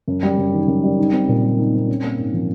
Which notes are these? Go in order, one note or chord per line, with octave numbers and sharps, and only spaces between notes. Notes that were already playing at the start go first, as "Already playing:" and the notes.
F#2
G3
F#2
D#3
F#2
G3
D#4
C4
A#2
G3
D#4
C4
C#4
A#3
G#2
F3